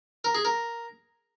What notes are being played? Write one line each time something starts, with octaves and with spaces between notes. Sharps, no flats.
A#4
G#4
A#4